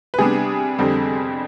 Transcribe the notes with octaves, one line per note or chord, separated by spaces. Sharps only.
B4
C3 G3 B3 D4 G#4
F2 D3 G3 C4